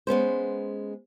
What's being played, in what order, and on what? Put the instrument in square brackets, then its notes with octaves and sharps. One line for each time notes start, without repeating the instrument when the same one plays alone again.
[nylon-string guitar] G#3 B3 C#4 C5